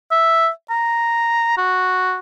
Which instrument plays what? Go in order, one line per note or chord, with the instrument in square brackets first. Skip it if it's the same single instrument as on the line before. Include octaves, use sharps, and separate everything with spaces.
[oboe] E5
A#5
F#4